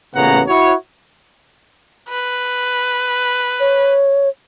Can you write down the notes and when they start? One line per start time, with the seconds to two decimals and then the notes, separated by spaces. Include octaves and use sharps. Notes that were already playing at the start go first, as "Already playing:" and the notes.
0.15 A1 A#2 C#3 B3 F#5 A#5
0.48 E4 F#4 C#5
2.09 B4
3.60 C#5